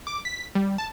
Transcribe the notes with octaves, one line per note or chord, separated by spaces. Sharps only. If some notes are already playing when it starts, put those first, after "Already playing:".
D6
B6
G3
A5